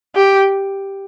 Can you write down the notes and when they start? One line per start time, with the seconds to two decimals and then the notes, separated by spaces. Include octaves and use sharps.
0.15 G4